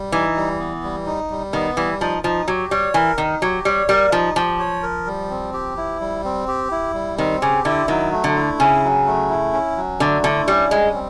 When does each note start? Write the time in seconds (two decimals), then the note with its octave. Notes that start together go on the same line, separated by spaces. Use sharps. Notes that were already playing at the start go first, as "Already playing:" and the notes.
Already playing: G3
0.12 E3 D#4
0.36 G3
0.59 B3
0.83 G3
1.06 D#4
1.30 G3
1.53 D#3 B3
1.77 E3 G3
2.01 F3 D#4
2.24 F3 D#4
2.48 F#3 G4
2.71 G3 C#5
2.94 E3 A#4
3.18 D#3 D#4
3.42 F#3 G4
3.65 G3 C#5
3.89 G3 A#4
4.12 F3 D#4
4.36 F3 G4
4.59 C#5
4.83 A#4
5.06 G3
5.30 C4
5.54 G4
5.77 E4
6.00 G3
6.24 C4
6.48 G4
6.71 E4
6.94 G3
7.18 D#3 C4
7.42 C#3 G4
7.65 D3 E4
7.88 D#3 F#3
8.12 A3
8.24 D3
8.36 E4
8.59 C#3 C#4
8.83 F#3
9.06 A3
9.29 E4
9.53 C#4
9.77 F#3
10.00 D3 A3
10.24 D3 E4
10.48 G3 C#4
10.71 G3 G#3
10.94 C4